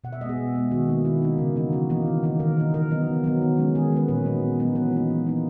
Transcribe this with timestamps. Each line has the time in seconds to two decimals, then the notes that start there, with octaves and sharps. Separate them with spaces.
0.04 B2 F#5
0.13 E5
0.21 G#3 D#5
0.26 B3 G#4
0.37 B2
0.55 G#3 B3
0.71 D#3 F#4
0.89 A#3 D#4
1.05 D#3 E4
1.22 A#3 D#4
1.38 C#3
1.56 E3 A#3 D#4
1.73 C#3 F#4
1.90 E3 A#3 D#4
2.06 D#3
2.23 A#3 D#4
2.39 D#3 A#4
2.57 A#3 D#4
2.74 D#3 A#4
2.90 F#3 B3 D#4
3.07 D#3
3.24 F#3 B3 D#4
3.42 D#3
3.57 G#3 C#4
3.75 D#3 G#4
3.92 G#3 C#4 B4
4.08 A#2 B4
4.25 F#3 B3 D#4
4.42 A#2
4.60 F#3 B3 D#4
4.75 E3 B4
4.92 A#3 D#4
5.10 E3
5.27 A#3 D#4